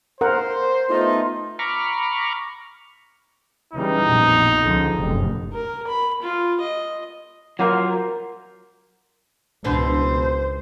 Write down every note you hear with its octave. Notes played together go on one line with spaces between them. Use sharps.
A#4 C5 F#5
A3 B3 D#4 F4
A#5 B5 C#6 D6 F6
C#3 E3 G3 D#4
A#1 F2 B2
C#2 D3 F3
F1 F#2 A2
A#4
B5
F4
D#5
F#3 A#3 F4 A#4 C5 F5
C#2 B2 E3 D4 C5